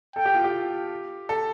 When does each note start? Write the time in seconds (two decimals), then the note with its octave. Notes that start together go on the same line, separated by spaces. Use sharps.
0.16 A4 G5
0.25 G4
0.34 F4
0.44 G4
1.29 A4